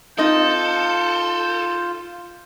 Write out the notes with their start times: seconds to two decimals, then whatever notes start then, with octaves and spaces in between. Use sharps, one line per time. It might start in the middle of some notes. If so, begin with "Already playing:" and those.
0.18 C4 D#4 F4 A4 D#5 G6